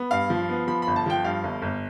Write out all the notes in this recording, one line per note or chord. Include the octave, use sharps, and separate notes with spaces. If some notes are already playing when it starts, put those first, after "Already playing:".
Already playing: B3
G2 F5
F3
B3
F3 B5
G1 B5
A5
F3 G5
G2 F5
G1
G1